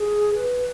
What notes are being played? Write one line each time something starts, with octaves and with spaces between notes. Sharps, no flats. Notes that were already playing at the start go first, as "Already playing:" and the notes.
Already playing: G#4
B4